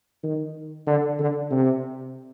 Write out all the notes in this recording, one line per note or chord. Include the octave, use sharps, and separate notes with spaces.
D#3
D3
D3
C3